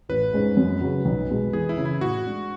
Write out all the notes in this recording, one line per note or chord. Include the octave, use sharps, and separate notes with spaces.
A1 B4
G#2 G#3 C#4
F#2
C#3 F#3
B1
B2 G#3
E2 G#4
E4
C#3 E3
E4
A2 F#4
G#3 D4